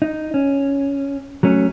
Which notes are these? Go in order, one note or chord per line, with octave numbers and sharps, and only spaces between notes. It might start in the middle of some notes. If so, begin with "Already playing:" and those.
D#4
C#4
F#3 A3 C#4